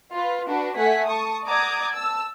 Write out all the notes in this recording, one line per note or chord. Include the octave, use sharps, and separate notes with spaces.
F4 B4
D4 F#4 B4
A3 F#5 G#5 B6
A5 C#6 D#6
D5 F#5 A#5 D6 D#6 G#6
A5 E6